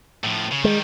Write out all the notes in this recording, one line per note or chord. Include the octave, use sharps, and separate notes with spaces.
A2 F3
C#3
D#3 G3 G#3